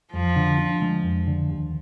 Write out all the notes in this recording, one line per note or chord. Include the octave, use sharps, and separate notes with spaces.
F2 F3
D3
D4
G#3
F2
D3
D#2